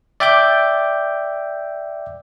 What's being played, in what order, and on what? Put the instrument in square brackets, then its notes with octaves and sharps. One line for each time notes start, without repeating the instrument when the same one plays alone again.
[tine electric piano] D5 E5 G5 D6 G6